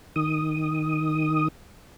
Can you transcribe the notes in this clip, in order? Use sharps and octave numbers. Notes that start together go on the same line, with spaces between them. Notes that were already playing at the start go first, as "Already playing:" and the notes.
D#3 D#6